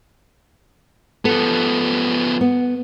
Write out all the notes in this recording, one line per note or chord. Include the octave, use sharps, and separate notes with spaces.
F3 B3 A4
B3